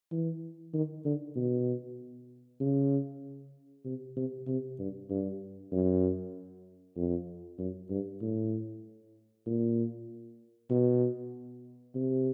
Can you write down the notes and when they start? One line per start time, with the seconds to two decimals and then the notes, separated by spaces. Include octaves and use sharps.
0.12 E3
0.74 D#3
1.05 D3
1.36 B2
2.60 C#3
3.85 C3
4.17 C3
4.48 C3
4.79 G2
5.10 G2
5.72 F#2
6.97 F2
7.59 F#2
7.90 G2
8.22 A2
9.46 A#2
10.70 B2
11.95 C3